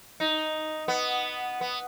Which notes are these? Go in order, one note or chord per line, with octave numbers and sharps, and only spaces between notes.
D#4
B3
B3